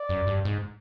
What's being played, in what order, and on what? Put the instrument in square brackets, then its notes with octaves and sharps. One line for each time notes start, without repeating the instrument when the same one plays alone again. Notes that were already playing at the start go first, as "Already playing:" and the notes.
Already playing: [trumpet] D5
[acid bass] F#2
G2
G#2